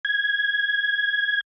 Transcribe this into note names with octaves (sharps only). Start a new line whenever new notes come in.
G#6